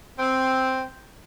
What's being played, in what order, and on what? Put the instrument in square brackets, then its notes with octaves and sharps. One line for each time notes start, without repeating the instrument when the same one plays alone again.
[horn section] C4